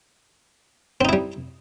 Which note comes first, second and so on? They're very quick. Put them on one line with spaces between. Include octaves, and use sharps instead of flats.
C4 D#4 E4 G3